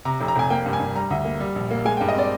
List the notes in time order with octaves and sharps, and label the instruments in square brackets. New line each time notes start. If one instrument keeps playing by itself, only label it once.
[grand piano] C3 A#5
F1
A#5
F1 G#5
A#3 G5
G2
G#5
G2
G3 A#5
D2
A#3
G3
A#1
A#3
G#3 G#5
G5
G2
D#5
C4 D5